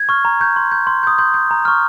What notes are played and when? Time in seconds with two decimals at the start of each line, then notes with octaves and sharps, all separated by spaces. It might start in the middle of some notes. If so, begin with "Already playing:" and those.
Already playing: G#6
0.09 C#6 F6
0.25 A#5
0.40 C#6 G6
0.56 C6
0.72 G6
0.87 C6
1.03 D#6 G6
1.19 C6 G6
1.34 G6
1.51 A#5
1.65 C#6 F6